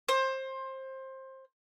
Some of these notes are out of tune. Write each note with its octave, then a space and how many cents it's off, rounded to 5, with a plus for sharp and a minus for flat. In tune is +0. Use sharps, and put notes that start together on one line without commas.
C5 +20